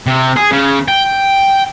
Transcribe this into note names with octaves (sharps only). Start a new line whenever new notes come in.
C3
G#4
C#3
G5